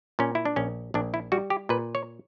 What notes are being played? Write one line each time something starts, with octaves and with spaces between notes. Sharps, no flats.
A#2 C#4
E4
D4
A#1 C#4
A#1 D4
E4
G3 F#4
G4
A#2 B4
C#5